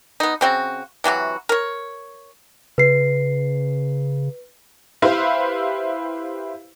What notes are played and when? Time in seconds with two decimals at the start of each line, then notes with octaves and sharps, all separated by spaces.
0.20 B3 D#4
0.41 C#3 C4 F#4
1.04 C3 E3 F#3 F#4
1.49 A#4 C#5
2.78 C#3 B4 C7
5.02 E4 G4 B4 C5 E5 F5